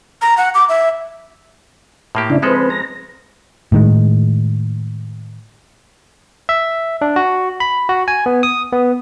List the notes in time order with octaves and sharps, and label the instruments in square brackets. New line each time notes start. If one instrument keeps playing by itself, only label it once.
[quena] A#5
F#5
D6
E5
[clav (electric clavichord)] A2 A#3 G4
[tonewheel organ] C#3 D4 E4
[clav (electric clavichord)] F3 G#3 A4 [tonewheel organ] C4 B4
[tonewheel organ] A#5
[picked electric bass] A2 D#3 G#3
[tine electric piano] E5
D4
F#4
B5
F#4
G#5
B3
D#6
B3